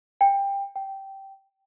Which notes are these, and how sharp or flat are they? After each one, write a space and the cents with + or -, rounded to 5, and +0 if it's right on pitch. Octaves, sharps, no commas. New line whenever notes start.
G5 +20
G5 -10